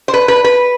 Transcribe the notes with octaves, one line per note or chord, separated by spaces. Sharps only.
C5
B4
B4
B4